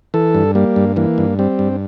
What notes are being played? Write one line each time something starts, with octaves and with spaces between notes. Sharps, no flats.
E3 A4
G2
G3 A#3
G2
E3 A#3
G2
G3 C4
G2